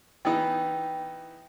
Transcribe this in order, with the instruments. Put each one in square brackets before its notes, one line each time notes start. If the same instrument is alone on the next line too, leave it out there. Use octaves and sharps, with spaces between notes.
[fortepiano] E3 B3 D#4 [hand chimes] G5